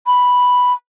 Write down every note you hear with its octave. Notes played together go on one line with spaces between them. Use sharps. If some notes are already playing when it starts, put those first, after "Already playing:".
B5